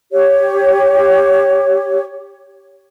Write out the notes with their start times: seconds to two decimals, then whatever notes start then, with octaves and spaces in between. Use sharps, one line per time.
0.12 G4 C#5